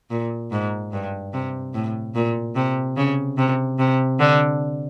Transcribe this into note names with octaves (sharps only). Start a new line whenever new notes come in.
A#2
G#2
G2
C3
A2
A#2
C3
C#3
C3
C3
D3